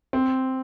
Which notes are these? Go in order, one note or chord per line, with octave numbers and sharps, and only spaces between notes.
C4